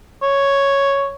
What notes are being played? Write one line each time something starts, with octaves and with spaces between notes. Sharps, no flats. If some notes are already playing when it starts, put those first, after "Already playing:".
C#5